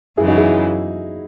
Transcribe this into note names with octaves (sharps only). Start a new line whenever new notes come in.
F#2 C#3 E3 G#3 E4 G#4
D#4 F#4
E4 G#4